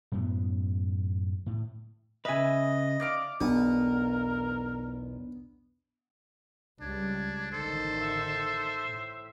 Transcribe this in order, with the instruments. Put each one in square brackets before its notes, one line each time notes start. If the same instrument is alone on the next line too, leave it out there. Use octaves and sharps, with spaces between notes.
[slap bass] F#2 A2 B3
A2
[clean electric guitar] C#3 B4 [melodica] D#5 [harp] E5 G#5
[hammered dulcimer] D5 F5 D6
[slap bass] B1 E2 [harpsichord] B3 [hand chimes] D4 [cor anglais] A#4
[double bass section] C#2 G3 [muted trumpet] D4 [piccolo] G#6
[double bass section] A1 D3 D#3 [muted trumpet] A4 [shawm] C5
[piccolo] E5
[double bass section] A2